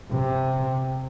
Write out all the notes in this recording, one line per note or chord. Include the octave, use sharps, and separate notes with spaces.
C3